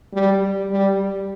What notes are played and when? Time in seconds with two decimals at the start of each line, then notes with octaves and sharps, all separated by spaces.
0.13 G3
0.71 G3